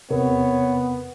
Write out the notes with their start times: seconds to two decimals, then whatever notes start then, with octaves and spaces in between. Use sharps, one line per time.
0.11 E2 C3 B3 A#4 C#5